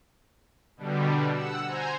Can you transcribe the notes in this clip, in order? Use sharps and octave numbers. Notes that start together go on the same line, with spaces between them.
B2 D3 G3
F#5 E6
C5 G#5 A#5